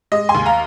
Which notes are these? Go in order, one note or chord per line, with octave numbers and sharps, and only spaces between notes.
G#3 D#5
G#5 C6
D#2
F5 A#5